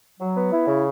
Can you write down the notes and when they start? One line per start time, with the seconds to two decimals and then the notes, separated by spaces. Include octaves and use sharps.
0.20 F#3
0.36 B3
0.52 E4
0.67 C#3